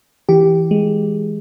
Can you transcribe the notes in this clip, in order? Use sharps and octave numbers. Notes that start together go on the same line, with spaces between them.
E3 G4
G#3